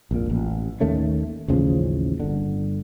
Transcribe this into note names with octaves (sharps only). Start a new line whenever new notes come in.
A#1 F2 A#2
A1
D#2 D#3 A3 C#4
A1 D#2 C#3 F3
G1 D3